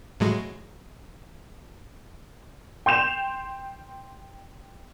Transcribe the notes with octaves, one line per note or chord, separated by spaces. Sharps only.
A2 F#3 G#3
G5 C6 G6 E7 F7